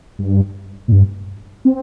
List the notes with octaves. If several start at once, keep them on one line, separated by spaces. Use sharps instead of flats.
G2
A#2
G2
C4